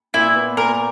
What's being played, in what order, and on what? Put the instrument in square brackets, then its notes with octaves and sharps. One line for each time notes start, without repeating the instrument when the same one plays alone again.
[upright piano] A#2 [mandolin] E4
[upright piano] B3
[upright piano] A#2 [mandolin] A#4